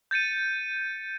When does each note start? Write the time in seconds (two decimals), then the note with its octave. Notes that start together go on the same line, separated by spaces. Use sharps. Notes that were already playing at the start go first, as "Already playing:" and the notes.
0.11 G6 A6 C#7 D#7